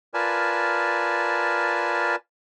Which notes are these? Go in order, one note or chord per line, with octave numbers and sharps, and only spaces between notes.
F4 A#4 B4 D5 G#5 A5